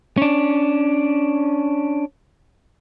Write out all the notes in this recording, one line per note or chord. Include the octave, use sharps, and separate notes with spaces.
C#4 D4